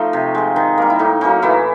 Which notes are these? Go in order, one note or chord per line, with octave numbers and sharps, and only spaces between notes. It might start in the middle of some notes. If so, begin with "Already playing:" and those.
Already playing: F3 A3 D#4
C3
F3 G#3
D#3
G3 A#3
E4
A2 D#4
F#3 A#3 C#4 D#4
A2 E3 E4